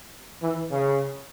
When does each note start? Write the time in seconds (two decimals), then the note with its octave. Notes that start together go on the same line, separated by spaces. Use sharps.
0.42 E3
0.71 C#3